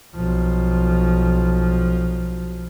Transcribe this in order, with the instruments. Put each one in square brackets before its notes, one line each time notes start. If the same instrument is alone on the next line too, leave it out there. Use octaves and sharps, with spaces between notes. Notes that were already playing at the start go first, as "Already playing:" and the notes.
[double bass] B1 F3